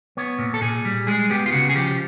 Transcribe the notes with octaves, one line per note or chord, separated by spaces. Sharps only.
B3 C#5
A#2
A4
A#2 G#4
G3
G#3 G#4
B3 G4
F4
C#3 F#4
G#4
F3 G4